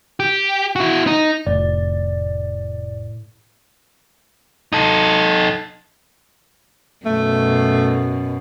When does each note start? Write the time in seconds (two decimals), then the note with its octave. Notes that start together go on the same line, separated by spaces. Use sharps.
0.20 G4
0.76 E4 F#4
1.07 D#4
1.47 F1 A2 D5
4.73 D#4 A4
7.06 F#2 B2 A3